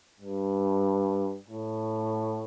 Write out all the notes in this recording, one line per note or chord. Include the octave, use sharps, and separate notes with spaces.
G2
A2